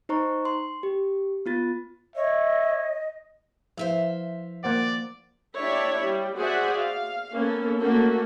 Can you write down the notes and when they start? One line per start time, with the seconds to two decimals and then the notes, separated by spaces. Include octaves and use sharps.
0.09 D#4 C5 A#5 C#6
0.45 C6
0.83 G4
1.46 B3 F4 A6
2.16 C#5 D#5 E5
3.77 F3 E4 B4 C5 E5 F5
4.64 A#3 C5 D5 F#5
5.58 D4 E4 G4 C#5 D5 E5
6.05 G3
6.38 F#4 G#4 C5 D5 E5 F#5
6.77 F5
7.34 A#3 B3 C#4 A4
7.78 A3 A#3 C#4 F#4 A4